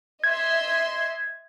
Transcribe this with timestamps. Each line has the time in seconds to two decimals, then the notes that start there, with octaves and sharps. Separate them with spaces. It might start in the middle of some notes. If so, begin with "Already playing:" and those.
0.24 D#5 E5 C6 G#6